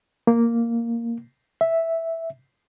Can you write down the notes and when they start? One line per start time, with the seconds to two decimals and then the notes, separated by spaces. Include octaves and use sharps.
0.27 A#3
1.61 E5